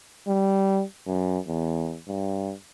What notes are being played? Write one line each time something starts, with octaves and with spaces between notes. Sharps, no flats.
G3
F#2
E2
G2